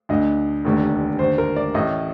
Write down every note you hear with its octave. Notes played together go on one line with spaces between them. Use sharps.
D2 D3 D#5
F1 D#2 D3
D#2 D3 C5
A#4
D5
A1 A2 D#5